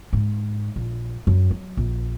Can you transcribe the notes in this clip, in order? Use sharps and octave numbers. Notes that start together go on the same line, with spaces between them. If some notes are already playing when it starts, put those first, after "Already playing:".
G#2
A#1
F#2
F#3
A#1